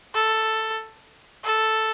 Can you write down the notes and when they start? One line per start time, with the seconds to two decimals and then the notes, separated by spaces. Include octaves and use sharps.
0.14 A4
1.44 A4